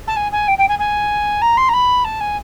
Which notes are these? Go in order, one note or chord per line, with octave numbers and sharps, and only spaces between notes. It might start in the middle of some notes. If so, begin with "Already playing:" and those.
A5
G#5
G#5
G5
G5
G#5
G#5
A#5
C6
A#5
B5
A5
G#5